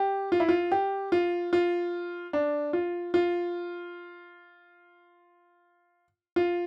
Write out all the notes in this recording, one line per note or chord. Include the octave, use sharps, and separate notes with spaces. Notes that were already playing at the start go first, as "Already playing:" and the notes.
Already playing: G4
F4
E4
F4
G4
F4
F4
D4
F4
F4
F4